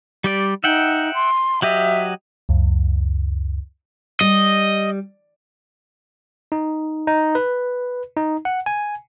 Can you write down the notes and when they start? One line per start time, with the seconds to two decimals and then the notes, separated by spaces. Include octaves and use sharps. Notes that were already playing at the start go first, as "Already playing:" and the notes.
0.24 G3 G4 D5
0.64 D#4 E5 F#5 G5
1.14 C6
1.62 F#3 G4 D#5 E5
2.49 C#2 F#2
4.21 G3 D#5
6.52 D#4
7.07 D#4
7.35 B4
8.17 D#4
8.45 F#5
8.66 G#5